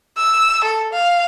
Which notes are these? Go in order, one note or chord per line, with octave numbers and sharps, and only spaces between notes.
E6
A4
F5